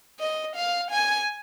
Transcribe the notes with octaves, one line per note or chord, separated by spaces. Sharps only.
D#5
F5
G#5